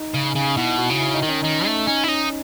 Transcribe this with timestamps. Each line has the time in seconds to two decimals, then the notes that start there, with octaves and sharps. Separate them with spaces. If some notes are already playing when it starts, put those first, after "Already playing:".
Already playing: D#4
0.14 C#3
0.35 C#3
0.57 B2 E4
0.78 F#4
0.90 C#3
1.00 E4
1.14 D#4
1.22 D#3
1.29 C#4
1.42 D#3 D#4
1.65 A3
1.87 C#4 D#4
2.04 E4
2.08 C#4 D#4